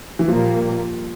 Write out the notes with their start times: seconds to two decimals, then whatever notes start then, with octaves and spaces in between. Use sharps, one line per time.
0.19 E3
0.27 A#2 F3 G3 A#3